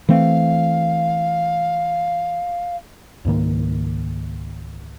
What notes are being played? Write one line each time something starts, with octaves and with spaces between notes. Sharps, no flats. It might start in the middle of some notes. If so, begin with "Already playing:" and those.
E3 A3 C4 F5
C#2 G#2 D#3 A#3